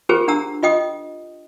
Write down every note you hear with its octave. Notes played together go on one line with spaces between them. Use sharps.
C#4 F4 G4 G#4 A#4 C5
D4 F#5 A#5 E6
F4 D#5 G5 D#6